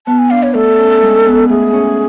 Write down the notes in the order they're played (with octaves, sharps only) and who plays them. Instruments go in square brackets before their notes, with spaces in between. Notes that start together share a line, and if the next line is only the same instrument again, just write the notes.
[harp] B3 [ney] A5
[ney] G#5
[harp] D4 [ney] F5
[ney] C#5
[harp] A3 [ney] A4
[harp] C#4
G#3
B3
[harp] A3 [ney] G#4
[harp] C#4